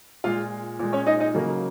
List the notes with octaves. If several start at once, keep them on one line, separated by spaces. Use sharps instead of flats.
A#2 G#3 F4 F5
A#2 G#3
C#4 C#5
D#4 D#5
D#4 D#5
C#3 F#3 A#3